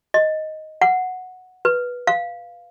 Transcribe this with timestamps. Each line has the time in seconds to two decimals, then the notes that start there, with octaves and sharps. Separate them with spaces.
0.14 D#5
0.82 F#5
1.65 B4
2.07 F5